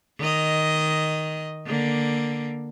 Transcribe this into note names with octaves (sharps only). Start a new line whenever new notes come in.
D#3 D#5
D3 A#3